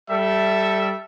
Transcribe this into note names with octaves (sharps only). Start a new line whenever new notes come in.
G3 A4 E5